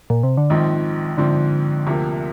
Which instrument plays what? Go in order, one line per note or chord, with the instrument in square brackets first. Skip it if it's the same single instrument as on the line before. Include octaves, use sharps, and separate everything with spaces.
[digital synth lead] A#2
C3
D3
[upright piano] A#1 G#2 F3 C4 [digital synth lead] D#3
[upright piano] A#1 G#2 F3 C4 [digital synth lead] D3
[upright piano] D2 C3 F3 A#3